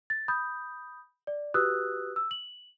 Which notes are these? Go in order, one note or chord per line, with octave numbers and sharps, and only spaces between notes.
A6
B5 D#6 G6
D5
F#4 G4 B4 D#6 E6 F#6
E6
F#7